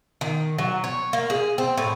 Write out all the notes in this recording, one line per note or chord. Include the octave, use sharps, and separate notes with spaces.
D#3
F#3
C#5
A#3
G#4
C4
A2